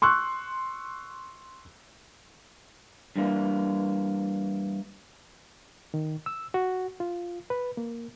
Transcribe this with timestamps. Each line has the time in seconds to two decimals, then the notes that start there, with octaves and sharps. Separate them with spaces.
0.02 C6 C#6 E6 F#6
3.16 G2 E3 A#3
5.94 D#3
6.26 E6
6.54 F#4
7.00 F4
7.50 B4
7.77 A#3